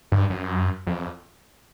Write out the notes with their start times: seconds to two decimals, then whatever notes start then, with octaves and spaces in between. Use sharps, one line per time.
0.12 G2
0.30 F#2
0.87 F2